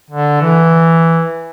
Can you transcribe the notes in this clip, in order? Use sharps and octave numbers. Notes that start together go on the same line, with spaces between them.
D3
E3